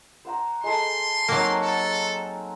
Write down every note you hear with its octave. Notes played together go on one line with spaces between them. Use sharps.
C5 F#5 A#5
G#3 A4 C6
F#3 A#3 C4 D#4
A4 F#5